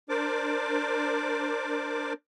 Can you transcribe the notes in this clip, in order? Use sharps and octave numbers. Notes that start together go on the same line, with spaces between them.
D4 A#4 C5 D5 D6